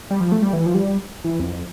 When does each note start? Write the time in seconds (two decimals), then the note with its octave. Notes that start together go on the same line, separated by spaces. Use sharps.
0.11 G3
0.20 F3
0.32 A3
0.42 G3
0.53 E3
0.66 F3
0.74 G3
1.24 E3
1.40 F2